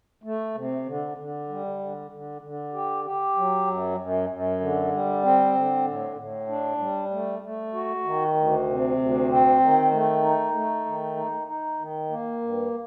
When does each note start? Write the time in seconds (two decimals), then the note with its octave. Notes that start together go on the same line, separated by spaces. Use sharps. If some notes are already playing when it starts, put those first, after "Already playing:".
0.24 A3
0.55 C3
0.86 D3
1.17 D3
1.48 G3
1.79 D3
2.11 D3
2.42 D3
2.73 G4
3.05 G4
3.36 F#3
3.67 F#2
3.98 F#2
4.29 F#2
4.60 D3
4.92 G3
5.23 C4
5.54 D3
5.85 A2
6.16 A2
6.48 D4
6.79 G3
7.11 A3
7.42 A3
7.73 F#4
8.04 D#3
8.35 D2
8.67 C3
8.97 D2
9.29 C4
9.60 D#3
9.91 A3
10.23 D#4
10.54 A3
10.85 D#3
11.17 D#4
11.47 D#4
11.79 D#3
12.10 A#3
12.41 G2